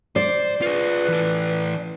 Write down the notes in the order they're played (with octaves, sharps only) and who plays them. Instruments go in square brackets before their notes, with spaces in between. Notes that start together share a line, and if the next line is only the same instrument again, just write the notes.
[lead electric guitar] C5 [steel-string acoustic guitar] D5
[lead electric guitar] F4 G#4 [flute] B4
[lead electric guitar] E3 A4